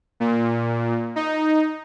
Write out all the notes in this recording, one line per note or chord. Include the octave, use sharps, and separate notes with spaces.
A#2
D#4